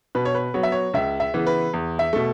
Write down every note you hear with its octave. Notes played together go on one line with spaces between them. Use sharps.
B2 B4
C#5
B4
F#3 B3 C#5
E5
C#5
C#2 E5
E5
C#3 E3 B3
B4
E2
E5
B2 A3